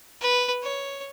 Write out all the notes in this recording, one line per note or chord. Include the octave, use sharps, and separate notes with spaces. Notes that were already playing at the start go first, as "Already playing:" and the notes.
B4
C#5